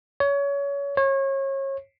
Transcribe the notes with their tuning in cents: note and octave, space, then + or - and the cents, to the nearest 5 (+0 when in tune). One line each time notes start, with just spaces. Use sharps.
C#5 +25
C#5 -30